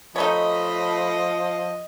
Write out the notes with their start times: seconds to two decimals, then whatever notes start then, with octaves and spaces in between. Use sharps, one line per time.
0.16 F3 A3 D#4 A4 C#5 D#5 B5